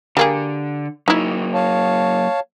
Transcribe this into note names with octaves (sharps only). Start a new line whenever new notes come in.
D3 G3 A#3 G#4
F#3 A#3 D#4 E4
C#5 F5 A5